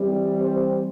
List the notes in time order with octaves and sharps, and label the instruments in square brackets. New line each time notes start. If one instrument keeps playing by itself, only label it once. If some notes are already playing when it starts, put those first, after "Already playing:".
Already playing: [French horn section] E3 G3 C4
C5